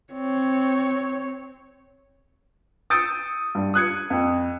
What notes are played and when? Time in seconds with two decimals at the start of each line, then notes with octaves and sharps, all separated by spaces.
0.13 C4 C#5
2.90 D#6 E6 G6 A6 C#7 D7
3.55 G2
3.74 D#6 F#6 G#6 C#7
4.10 F2